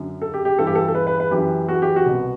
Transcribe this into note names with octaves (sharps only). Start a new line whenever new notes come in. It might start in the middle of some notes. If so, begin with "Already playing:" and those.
Already playing: F#2 D3
A4
G4
G4
G2 E3 A4
G4
A4
A4
B4
B4
B4
F#2 E3 G4
F#4
G4
F#4
C2 B2